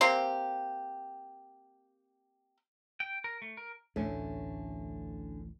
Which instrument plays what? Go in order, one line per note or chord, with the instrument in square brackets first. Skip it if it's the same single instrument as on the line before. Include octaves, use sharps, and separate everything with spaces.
[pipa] A#3 C4 G4
[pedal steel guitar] G5
A#4
A3
A#4
[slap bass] A1 D2 A2 [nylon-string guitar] D3 A3 C#4